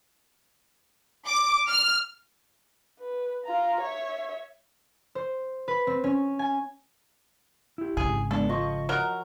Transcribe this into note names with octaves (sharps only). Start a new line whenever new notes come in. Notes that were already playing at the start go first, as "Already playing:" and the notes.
D6
F6
B4
F4 A#5
C#5 E5
C5
B4
C4
C#4
G#5
E4 G4
G#1 C#3 G#4
G#3 B3 D4 A4
F3 D#5 C#6
F#3 A#4